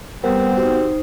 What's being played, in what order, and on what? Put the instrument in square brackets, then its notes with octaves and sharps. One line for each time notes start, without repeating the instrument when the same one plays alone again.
[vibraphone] G3 [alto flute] B3 [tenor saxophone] C4 [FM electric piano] G4 A#4 F#5
[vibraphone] D#4 C5 [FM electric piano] F#4 G4